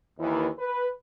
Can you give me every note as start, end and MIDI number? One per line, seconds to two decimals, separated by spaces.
0.19 0.47 39
0.19 0.47 52
0.57 0.87 71